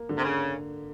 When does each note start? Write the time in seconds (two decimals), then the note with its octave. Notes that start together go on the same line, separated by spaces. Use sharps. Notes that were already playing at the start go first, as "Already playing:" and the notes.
Already playing: A#3
0.09 D3
0.18 C3
0.24 C#3